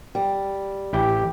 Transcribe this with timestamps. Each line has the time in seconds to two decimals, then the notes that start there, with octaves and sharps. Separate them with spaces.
0.15 G3
0.93 A1 E4 G4 G5